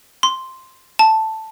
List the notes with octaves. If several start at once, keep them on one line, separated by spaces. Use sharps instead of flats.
C6
A5